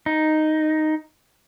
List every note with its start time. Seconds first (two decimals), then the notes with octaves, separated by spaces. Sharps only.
0.06 D#4